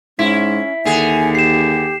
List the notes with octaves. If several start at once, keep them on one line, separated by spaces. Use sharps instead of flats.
G#2 C#4 E4 B6
D#2 D3 G#4 G#5
G4 C7 E7